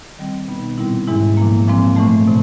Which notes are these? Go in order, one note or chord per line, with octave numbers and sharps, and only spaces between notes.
D#3 G3 C4
B2 G3 B3 D#4
A#2 G3 C4 E4
G#2 E3 G#3 C#4 E4
A#2 F3 A#3
A#2 F3 G#3 C4
A2 E3 A3
C3